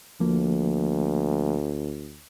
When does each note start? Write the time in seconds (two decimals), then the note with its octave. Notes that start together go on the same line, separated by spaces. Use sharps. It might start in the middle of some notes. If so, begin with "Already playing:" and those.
0.20 D2 F3 A#3